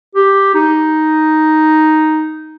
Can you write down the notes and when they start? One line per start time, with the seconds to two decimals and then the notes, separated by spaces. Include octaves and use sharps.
0.15 G4
0.54 D#4